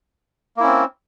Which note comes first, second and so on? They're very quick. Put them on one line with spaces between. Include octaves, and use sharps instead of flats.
A#3 E4 C#4 C4